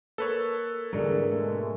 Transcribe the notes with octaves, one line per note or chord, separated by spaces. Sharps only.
A#3 A4 B4 C#5
G#2 D3 E3 F#3 G3 A#3 D4 G#4
B2 G#3 A3